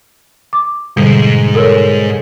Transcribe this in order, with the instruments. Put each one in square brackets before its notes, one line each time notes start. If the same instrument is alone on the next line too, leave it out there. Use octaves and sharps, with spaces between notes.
[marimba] D6
[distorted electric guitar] G#2 G#3 [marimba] B2 D3 G3
[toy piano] A4 A#4 C#5